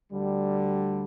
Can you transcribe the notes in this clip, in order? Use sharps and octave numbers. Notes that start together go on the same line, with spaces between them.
D2 D3 G3